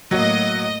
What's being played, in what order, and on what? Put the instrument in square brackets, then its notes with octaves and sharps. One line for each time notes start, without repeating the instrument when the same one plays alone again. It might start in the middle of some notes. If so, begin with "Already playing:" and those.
[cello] A2 A#3 [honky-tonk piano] F#3 F#4 [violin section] D#5